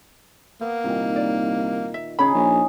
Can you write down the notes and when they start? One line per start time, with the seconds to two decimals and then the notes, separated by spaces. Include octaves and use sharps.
0.61 A#3 B3
0.84 C2 A#2 D#3
1.16 D5
1.94 E5
2.19 C#3 C#4 D#4 G#4 C#5 B5
2.34 A#1